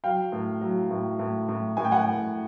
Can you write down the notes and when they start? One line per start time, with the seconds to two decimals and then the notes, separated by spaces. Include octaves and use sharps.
0.04 F#3 F5 G5
0.32 A2
0.61 F#3
0.91 A2
1.19 A2
1.49 A2
1.77 A2 G#5
1.84 G5
1.91 F#5 G#5
2.06 A2